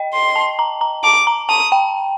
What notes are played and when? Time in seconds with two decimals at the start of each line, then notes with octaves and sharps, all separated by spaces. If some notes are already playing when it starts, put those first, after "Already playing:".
Already playing: D#5 G5
0.14 C6
0.36 A5
0.59 A#5
0.81 A#5
1.04 A5 D6
1.27 A#5
1.49 A5 D#6
1.72 G5